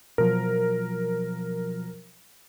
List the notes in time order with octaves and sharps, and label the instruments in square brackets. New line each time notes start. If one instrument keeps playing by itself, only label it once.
[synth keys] B2 F3 F#3 [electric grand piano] A#4